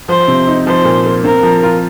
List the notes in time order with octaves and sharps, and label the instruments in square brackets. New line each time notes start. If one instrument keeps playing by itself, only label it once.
[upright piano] F3 [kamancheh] C5
[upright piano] C3
D#4
[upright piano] F3 [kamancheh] C5
[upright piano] A#2
A#3
[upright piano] C4 [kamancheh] A#4
[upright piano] F3
F4